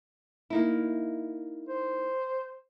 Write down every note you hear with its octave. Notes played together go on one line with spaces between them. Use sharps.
A#3 D#4 E4
C5